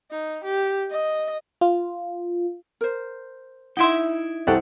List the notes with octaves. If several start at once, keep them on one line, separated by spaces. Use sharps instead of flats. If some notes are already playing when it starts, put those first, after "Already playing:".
D#4
G4
D#5
F4
A#4 C5
D#4 E4 E5 F#5 C6
C2 C4 F#4 G4 A4 F#5